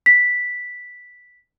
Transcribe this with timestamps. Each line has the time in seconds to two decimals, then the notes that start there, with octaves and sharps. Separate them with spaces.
0.06 B6